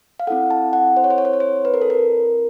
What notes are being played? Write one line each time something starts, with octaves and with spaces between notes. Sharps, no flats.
F5
C4 E4 A4 F#5
A5
F#5
C5
C#5
C5
C#5
C5
C#5
C5
B4
A#4
A4
A#4